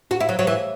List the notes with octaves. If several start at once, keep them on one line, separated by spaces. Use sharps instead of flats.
F#4
E4
F#3
F#3
E3